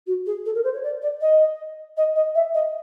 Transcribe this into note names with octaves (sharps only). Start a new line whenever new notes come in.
F#4
G#4
A4
A#4
C5
C#5
D5
D5
D#5
D#5
D#5
E5
D#5